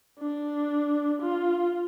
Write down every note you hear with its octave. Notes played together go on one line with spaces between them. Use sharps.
D4
F4